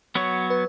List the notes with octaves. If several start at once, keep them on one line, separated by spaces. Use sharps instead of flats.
F#3 B3 F#4 C#5
B4